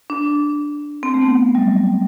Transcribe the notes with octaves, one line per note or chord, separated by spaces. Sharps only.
D4
C4
A3
B3
G3
F#3